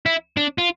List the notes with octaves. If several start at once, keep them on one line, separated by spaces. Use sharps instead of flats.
E4
D4
F4